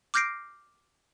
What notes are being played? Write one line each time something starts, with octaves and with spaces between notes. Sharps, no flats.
D6 F6 G6 A#6 C7 D7